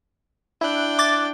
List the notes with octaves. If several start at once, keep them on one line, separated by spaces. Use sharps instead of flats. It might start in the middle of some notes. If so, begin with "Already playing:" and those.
D4 E4 G5 F#6
D6 A6